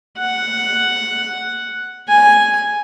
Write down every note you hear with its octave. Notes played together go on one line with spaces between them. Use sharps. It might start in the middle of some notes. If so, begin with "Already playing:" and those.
F#5
G#5